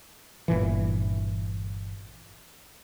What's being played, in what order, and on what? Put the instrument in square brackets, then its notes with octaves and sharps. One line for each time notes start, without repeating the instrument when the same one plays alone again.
[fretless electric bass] G1 A#2 E3